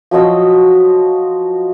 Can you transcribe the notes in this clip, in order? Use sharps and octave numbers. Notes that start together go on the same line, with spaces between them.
F3 F#3 D#5 E6